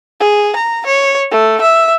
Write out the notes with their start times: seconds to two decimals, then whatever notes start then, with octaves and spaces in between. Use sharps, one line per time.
0.20 G#4
0.56 A#5
0.86 C#5
1.31 A3
1.61 E5